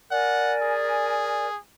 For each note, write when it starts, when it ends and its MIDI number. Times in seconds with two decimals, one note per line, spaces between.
0.11 1.48 70
0.11 1.48 74
0.11 0.54 78
0.11 1.48 80
0.62 1.58 68